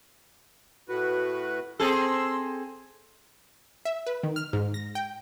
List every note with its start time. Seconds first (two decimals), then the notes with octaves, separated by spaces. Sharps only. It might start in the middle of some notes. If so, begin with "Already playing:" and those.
0.89 A2 F#4 B4
1.80 C4 G#4 A4 C6 E6
3.85 E5
4.07 B4
4.23 D#3
4.36 F6
4.53 G#2
4.74 A#6
4.95 G5